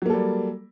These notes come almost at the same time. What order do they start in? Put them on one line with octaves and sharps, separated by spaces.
F#3 A#3 A4 G3